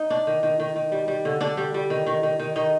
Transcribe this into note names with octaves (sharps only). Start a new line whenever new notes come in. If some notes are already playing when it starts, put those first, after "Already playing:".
Already playing: D#4
D4
D#3
D#3
D#3
D#3
G3
G3
D3
D3 D4
G3
G3
D#3
D#3
D#3
D#3
D#3 D#4